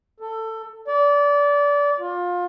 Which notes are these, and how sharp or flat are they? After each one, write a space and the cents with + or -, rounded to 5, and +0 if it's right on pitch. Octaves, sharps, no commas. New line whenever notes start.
A4 +20
D5 -25
F4 +25